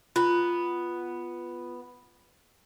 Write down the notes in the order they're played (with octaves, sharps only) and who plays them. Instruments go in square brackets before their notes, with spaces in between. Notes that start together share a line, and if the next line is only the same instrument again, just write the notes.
[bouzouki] B3 [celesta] F4